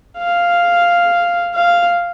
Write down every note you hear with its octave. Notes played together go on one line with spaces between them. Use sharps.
F5
F5